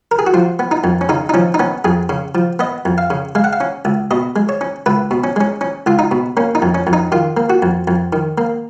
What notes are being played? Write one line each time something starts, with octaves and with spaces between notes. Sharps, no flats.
A#4
G#4
F#4
F3 F4
B3
D#4
F2
C#4
C#3 D#4
D#4
F3 C#4
D#4
B3 C#4
F2 G#4
C#3
F3
B3 D#5
F2
F5
C#3
G#3 F5
F#5
F5
C#4
C#2
B2 D#5
G#3
C#5
C#4
C#2 B4
B2
C#4
G#3 C#4
C#4
C#2 F4
D#4
B2
A#3 C#4
D#4
F2
C#4
F2
D#4
D#3 F4
A#3
F#4
F2
F2
D#3
A#3